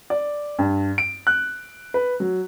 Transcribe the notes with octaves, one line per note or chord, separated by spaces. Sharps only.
D5
G2
D7
F#6
B4
F#3